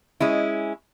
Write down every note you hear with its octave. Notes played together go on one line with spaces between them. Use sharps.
G#3 C#4 E4